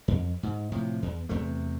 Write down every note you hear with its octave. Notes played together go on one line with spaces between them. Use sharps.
F2
G#2
A2 C3 F3
E2
E2 C3 A3